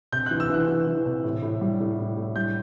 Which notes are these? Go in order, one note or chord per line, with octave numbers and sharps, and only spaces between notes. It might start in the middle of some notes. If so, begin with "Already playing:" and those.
C3 G6
E3 F#6
E6
E3 F#6
E3
E3
C3
A2
A2
G3
A2
A2
A2
G3 G6